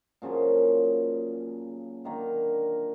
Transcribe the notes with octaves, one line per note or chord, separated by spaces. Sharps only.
A#2 C#3 F3 F#3
D3 D#3 A#3